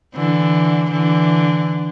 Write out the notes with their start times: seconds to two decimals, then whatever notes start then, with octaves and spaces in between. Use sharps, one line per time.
0.15 D3 E3
0.90 D3 E3